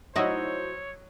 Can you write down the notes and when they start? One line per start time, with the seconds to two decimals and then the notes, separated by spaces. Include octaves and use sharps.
0.16 F#3 D#4 E4 F#4 C5 C#5 D#5 E6